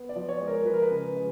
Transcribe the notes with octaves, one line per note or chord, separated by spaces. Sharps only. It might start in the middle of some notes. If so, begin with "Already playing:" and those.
Already playing: B3
D5
F3
C#5
G#3
A#4
F3 B4
A#4
B4
C#3
G#3